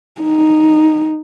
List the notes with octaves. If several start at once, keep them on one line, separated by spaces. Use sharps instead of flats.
D#4